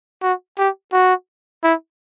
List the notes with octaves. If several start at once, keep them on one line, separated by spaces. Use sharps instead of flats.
F#4
G4
F#4
E4